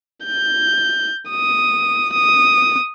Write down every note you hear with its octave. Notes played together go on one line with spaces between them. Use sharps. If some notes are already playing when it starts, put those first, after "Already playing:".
G6
D#6
D#6